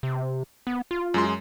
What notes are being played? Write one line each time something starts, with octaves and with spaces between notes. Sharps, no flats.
C3
B3
F4
F#2 G#3 C6